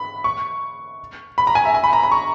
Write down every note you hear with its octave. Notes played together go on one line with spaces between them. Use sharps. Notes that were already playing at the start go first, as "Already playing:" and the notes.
Already playing: B5
C#6
B5
A#5
G#5
E5
G#5
B5
A#5
B5
C#6